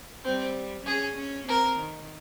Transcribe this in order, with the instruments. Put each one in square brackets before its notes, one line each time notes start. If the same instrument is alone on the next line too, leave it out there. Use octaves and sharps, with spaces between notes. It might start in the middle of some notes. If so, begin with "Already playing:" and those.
[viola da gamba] G3 [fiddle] C4
[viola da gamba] C#4 [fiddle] G#4
[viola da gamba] C#4
[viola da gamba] C4 [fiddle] A#4
[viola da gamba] D#3